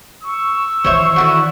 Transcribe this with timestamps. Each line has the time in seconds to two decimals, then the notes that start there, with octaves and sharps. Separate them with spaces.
0.23 C#6 E6
0.84 D#3 E3 C5 C#5 E5
1.16 D3 E4 F#4